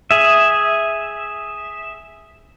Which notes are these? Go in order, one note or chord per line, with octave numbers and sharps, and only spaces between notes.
G#4 E5